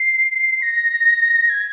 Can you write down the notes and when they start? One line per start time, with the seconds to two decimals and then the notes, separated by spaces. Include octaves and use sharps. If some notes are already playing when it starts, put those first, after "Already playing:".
Already playing: C7
0.62 A#6
1.49 G#6